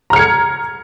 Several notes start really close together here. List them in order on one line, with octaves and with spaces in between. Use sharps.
A#5 F6 C#7 G#6